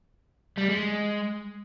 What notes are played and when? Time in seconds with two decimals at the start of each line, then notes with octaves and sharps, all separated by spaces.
0.58 G3
0.69 G#3